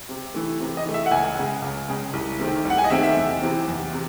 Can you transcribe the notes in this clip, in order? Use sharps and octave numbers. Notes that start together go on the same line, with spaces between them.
C3
E3 A3
C3
D#5
E3 A3
E5
F#5
C#2 G#5
C#3 G#3
C#2
C#3 G#3
C2
C3 D#3 A3 C4
C2
F#5
G#5
D#5
C3 D#3 A3 C4 E5
E5
E2
C3 E3 C4
E2
C3